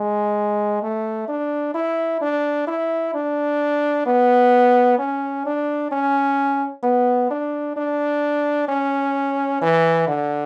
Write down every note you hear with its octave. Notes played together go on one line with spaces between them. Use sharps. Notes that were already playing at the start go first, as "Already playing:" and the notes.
Already playing: G#3
A3
D4
E4
D4
E4
D4
B3
C#4
D4
C#4
B3
D4
D4
C#4
E3
D3